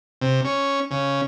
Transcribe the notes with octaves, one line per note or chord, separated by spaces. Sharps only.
C3
C#4
C#3